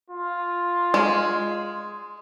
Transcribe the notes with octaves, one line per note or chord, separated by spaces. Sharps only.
F4
G#3